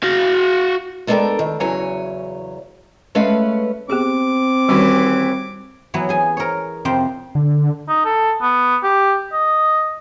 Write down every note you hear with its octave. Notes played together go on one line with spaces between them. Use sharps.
F#4 F5
G#3 B3 D4 A4 A#4 G5
D#3
E2 C#3 E3 F#3 C#5 G#5
G#3 A3 B3 C#4 B4 F5
B3 C4 G4 G#4 D6
D#2 E3 G3 C#4 F#4
E3 F#3 B3
G#4 G#5
A#4 C#5
F2 C3 C5 G5
D3
D#4
A4
B3
G4
D#5